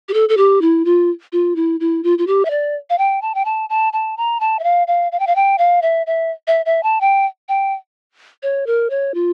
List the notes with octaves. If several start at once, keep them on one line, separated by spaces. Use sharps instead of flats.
G4
A4
A4
G4
E4
F4
F4
E4
E4
F4
F4
G4
E5
D5
F5
G5
A5
G5
A5
A5
A5
A#5
A5
E5
F5
F5
F5
G5
F5
G5
F5
E5
E5
E5
E5
A5
G5
G5
C#5
A#4
C#5
F4